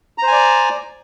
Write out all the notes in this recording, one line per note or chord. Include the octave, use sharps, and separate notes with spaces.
C5 D5 G#5 A#5